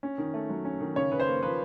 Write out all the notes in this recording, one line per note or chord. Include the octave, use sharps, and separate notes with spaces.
C#4
D#3
A3
F#3
C#4
D#3
C#3 C#5
C#3 B4
C5
A#3
F3 B4